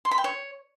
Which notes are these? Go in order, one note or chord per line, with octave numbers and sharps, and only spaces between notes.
C6
B5
G5
C#5